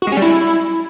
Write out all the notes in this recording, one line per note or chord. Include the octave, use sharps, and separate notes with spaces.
F#4
G#3
C#4
G3
E4